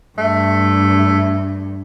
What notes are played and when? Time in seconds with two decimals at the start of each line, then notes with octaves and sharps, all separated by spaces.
0.18 G2 A3